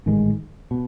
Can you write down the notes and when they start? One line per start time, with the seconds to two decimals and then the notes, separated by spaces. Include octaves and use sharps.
0.06 A1 G#2 D#3 G#3
0.71 B2